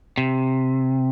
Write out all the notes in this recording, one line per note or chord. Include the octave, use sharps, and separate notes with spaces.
C3